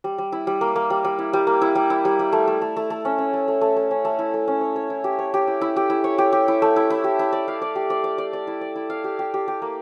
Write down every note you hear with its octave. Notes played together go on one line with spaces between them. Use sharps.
G3
G3
E4
G3
A#3
A#3
G3
G3
E4
G3
A#3
E4
G3
E4
G3
G3
A3
A3
A3
A3
A3
C#4
C#4
A3
A3
A3
A3
C#4
A3
E4
A3
C#4
C#5
C#5
E4
G4
C#5
G4
E4
E4
G4
E4
C#5
G4
G4
E4
A3
E4
E4
G4
E4
D5
F5
D5
G4
D5
D5
D5
D5
E4
D5
E4
F5
G4
G4
G4
G4
A#3